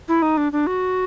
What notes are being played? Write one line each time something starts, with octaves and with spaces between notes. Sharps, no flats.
E4
D#4
D4
D4
F#4